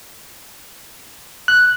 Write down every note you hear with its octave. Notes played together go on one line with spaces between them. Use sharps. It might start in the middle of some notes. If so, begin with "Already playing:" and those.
F#6